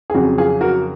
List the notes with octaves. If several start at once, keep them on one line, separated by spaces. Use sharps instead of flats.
G#4
F2 C#3 F#3 F#4
F4 G#4
F#4 A#4